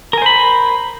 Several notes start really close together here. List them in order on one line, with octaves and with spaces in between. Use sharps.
A#4 G#5 C5 B5